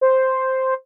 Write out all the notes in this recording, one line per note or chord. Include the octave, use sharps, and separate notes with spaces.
C5